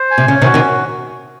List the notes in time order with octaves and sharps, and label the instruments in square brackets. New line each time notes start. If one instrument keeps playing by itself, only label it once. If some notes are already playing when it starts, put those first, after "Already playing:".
Already playing: [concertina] C5
G#5
[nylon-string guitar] C3
[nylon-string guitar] C#3 [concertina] C#4
[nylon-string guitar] C3 D#3
[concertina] F#4
[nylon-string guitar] C3 D#3